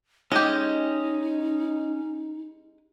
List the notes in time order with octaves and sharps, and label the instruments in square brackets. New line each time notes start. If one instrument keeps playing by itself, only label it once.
[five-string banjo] G#3 G4 [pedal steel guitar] C#4 D#5 [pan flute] D#4